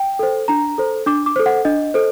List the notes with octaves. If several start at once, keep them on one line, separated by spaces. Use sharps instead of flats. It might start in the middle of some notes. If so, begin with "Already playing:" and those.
Already playing: G5
A4 C5
D4 A#5
A4 C5
D4 D6
D6
A4 C5
F#5
D4 D#5
A4 C5